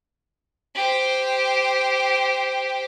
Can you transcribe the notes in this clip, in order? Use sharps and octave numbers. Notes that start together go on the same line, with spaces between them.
G4 C5